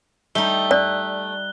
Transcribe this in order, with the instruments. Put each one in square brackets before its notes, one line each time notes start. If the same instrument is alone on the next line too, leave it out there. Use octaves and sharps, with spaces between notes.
[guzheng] G3 D#4 [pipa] A3 [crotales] G7
[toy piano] D5 [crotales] F#6